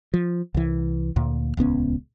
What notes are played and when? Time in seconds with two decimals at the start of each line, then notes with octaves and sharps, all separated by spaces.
0.14 F3
0.54 C2 E3
1.16 D2 A#2
1.57 D#1 C#2 B3 C#4